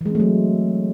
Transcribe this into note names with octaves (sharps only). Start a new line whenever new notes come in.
E3 F#3 G#3 A3 C4